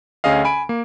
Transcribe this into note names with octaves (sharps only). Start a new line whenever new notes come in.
D2 C#4 G#4 D#5 F5
G#5 B5 D7
A#3